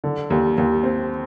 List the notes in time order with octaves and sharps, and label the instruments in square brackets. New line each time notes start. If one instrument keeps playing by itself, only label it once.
[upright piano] D3
D#2
D#2
C4